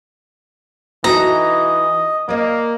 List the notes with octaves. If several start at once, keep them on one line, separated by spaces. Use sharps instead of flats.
E3 D#4 F#4 A4 D#5 A#5
A#3 D5 D#5